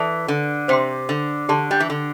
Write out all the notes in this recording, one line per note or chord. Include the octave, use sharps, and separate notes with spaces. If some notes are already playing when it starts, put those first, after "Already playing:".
Already playing: E3 A4 D5 A5
D3
C3 C5 G5 C6
D3
D3 G4 D5 A5 C6
G3
E3
D3